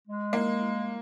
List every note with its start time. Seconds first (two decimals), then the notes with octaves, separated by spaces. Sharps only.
0.07 G#3
0.33 A#3